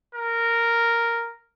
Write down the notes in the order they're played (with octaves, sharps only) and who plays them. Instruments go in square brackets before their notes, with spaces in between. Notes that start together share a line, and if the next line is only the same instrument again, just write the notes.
[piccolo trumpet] A#4